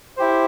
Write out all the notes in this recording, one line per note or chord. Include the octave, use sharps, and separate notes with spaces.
E4 G4 C5